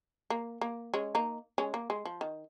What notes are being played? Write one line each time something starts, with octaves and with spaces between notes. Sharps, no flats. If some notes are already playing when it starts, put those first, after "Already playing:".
A#3
A#3
G#3 C#4
A#3 D#4
G#3 C#4
A#3
G#3
F3
D#3